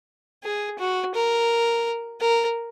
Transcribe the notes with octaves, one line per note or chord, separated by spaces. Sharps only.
G#4
F#4
A#4
A#4